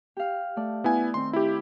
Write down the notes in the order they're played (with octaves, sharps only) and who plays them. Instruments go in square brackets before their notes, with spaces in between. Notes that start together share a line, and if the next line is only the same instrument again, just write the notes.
[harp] G4 F5
A3 D5
[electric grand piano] B3 E4 G#5
[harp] D#3 C4 [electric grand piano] C6
[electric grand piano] E4 G4